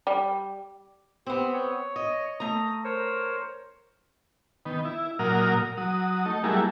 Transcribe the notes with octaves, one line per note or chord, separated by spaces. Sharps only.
G3
B3 C4 G4
C#5
D#5
A3 A#5 D#6
A#4 C5 C#5
D#3 B3
E4
A#2 F#3 A#4 D#6 F6
F#3 D#6
A3 D#4
F#3 G3 A3 A#3 E4 G#4